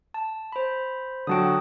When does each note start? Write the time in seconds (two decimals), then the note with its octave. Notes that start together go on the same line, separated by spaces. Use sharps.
0.14 A5
0.52 C5 B5
1.27 D3 F#3 F#4 G5 A5 D#6